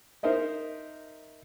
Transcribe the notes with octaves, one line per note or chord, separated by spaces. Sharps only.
D#4 A#4 C5 D#5 E5